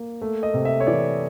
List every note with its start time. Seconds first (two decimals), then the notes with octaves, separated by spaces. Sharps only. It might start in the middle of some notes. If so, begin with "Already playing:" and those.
Already playing: A#3
0.22 A3
0.43 D#5
0.54 C3
0.65 E5
0.80 C#5
0.87 E3 D5